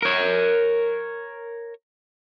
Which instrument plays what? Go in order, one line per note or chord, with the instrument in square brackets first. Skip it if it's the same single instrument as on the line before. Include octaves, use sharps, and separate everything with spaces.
[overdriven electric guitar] A#4 C#5